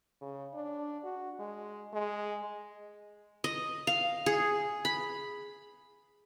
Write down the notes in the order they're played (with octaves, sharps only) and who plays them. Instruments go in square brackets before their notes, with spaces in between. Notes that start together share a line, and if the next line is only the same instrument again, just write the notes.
[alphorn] C#3
D4
F#4
G#3
G#3
[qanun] D#5
F5
G#4
B5